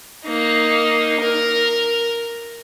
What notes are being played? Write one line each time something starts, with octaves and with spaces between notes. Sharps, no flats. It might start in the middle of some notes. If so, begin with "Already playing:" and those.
A#3 D#4
A#4